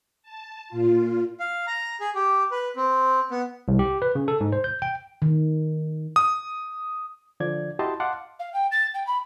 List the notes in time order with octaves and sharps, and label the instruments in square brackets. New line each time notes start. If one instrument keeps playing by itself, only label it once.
[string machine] A5
A#2 F4
[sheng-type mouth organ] F5
A#5
G#4
G4
B4
C4
B3
[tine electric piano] C2
G4
B4
C#3
A4
G#2
C5
G6
G5
[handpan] D#3
[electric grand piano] D#6
[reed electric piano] D3 F3 D5 G#6
E4 F#4 G4 D#5 A5 C6
D#5 F5 F#5 A5 C6 D6
[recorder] F5
G5
A6
G5
B5